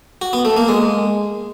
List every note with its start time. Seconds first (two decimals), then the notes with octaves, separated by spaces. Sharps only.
0.21 F#4
0.33 B3
0.45 A3
0.57 A#3
0.68 G#3